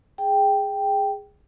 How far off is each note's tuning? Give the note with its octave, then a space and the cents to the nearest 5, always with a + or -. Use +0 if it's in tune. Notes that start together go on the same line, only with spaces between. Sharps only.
G#4 -5 G5 +0